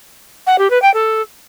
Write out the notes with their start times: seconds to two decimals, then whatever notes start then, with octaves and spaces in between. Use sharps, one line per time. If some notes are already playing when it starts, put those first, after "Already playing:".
0.46 F#5
0.58 G4
0.70 B4
0.82 G5
0.94 A4